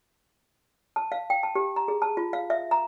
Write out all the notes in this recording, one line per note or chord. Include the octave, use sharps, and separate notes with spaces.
A5
F5
G5
A5
G4
A#5
G#4
A5
F4
F5
E5
A#5